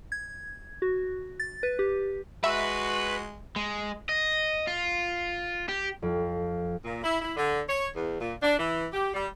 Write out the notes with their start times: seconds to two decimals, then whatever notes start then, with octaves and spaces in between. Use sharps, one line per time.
0.12 G#6
0.82 F#4
1.40 A6
1.63 B4
1.79 G4
2.44 G#3 F#4 B4 E5
3.56 G#3
4.09 D#5
4.67 F4
5.69 G4
6.02 F2
6.85 A#2
7.04 E4
7.22 E4
7.37 D3
7.69 C#5
7.95 E2
8.21 A#2
8.43 D4
8.59 E3
8.93 G4
9.14 G3